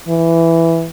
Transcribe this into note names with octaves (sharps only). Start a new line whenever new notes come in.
E3